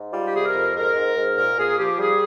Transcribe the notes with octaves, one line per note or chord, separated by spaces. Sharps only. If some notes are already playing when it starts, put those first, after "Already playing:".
Already playing: G#2
G3 F4
G4
C3 G#4
A#4
F2
G#2 A#4
G#2
G#2
A#2 A#4
A#2 G#4
F3 G4
G3 G#4